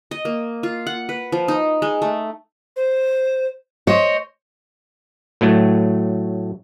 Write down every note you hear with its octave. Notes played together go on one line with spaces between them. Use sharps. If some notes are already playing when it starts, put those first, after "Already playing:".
D#5
A#3
F4
F#5
B4
F3
D#4
G#3
A3
C5
C5 C#5 D#5
A2 F#3 A3